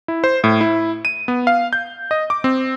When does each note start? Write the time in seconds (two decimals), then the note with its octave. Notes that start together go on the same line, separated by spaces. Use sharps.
0.08 E4
0.24 C5
0.44 A2
0.61 E4
1.05 D#7
1.28 B3
1.47 F5
1.73 G6
2.11 D#5
2.30 D6
2.44 C4